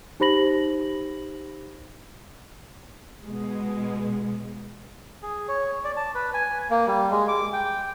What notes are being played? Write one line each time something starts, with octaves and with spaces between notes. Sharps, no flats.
D#4 G4 C5 B5 A#6 F#7
B2 G#3
G#4
C#5
D5
A5
B4
G#5
A#3
G3
G#3
D6
G5